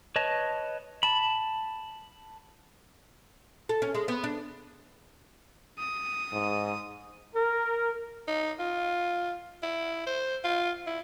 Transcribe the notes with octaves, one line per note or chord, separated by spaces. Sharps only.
B4 C#5 D#5 A5
A5 B5
A4
C#4
G#3
B3
D4
D#6
G#2
A#4
D#4
F4
E4
C5
F4
E4